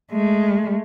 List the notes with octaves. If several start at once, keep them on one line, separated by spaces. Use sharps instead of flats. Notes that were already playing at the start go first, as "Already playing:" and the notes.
G#3 A3